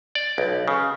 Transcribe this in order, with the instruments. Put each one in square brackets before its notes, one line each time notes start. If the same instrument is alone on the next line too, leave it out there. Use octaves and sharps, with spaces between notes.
[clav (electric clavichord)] D5
B1
C#3